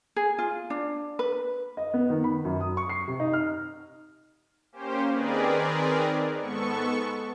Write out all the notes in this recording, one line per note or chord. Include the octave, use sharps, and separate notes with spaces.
G#4
F4
D4
B4
D#5
B3
D#3
B5
F#2
D#6
C#6
C7
C3
D#4
F6
A#3 C#4 G4 C5
D#3 C4 G#4 A#4 B4 D5
G#2 B3 A4 C#6